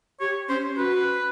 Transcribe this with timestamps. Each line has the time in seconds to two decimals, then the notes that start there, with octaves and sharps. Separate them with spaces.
0.20 G4 C#5
0.49 C#4 C5
0.76 F#4 B4